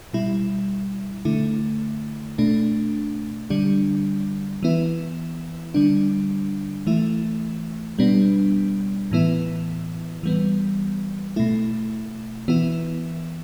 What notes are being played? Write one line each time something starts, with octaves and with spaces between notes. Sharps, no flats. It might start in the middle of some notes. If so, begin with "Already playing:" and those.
B2 G3 E4
D3 A3 E4
B2 A3 D4
D3 G3 D4
E3 B3 E4
D3 G3 D4
E3 A3 E4
B2 G3 B3 D4
A2 E3 B3 E4
E3 G3 B3
B2 A3 E4
E3 B3 E4